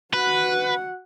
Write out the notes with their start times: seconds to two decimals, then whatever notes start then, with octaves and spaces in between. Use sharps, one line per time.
0.13 F#4 B4 F#5